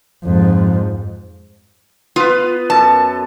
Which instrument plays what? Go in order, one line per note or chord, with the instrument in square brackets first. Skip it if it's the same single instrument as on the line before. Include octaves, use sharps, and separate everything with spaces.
[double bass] F2 G#2
[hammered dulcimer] B3 B4 [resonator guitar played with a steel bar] F4
[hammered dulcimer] F#2 A4 [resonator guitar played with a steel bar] A5